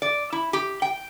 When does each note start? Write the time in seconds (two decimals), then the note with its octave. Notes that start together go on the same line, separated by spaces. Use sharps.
0.02 D5
0.32 E4
0.53 G4
0.82 G5